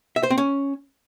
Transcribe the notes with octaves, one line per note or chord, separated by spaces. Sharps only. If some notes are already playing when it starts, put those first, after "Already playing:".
E5
C5
C4
C#4